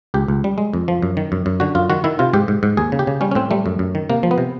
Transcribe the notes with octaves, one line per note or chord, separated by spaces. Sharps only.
C#2 G4
C#2
G3
G#3
F2
F3
F#2
D#3
F#2
F#2
D3 F#4
F#2 F4
D#3 F#4
D#3 E4
C3 F4
G#2 G4
G#2
G#2
D#2 G#4
C#3
G4
C#3
G3 C#4
C#4
A2 C4
G3 A3
F#2
F#2
D#3
C3 A#3
F3
B3
C3